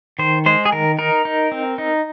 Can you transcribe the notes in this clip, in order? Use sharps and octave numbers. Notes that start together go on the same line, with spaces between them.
D#3 C5
G#3 C5
G#4
D#3 A#4
D#4 A#4
D#4
C4
D#4